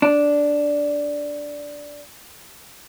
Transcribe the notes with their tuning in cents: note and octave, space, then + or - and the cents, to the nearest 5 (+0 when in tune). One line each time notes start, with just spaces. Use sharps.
D4 -5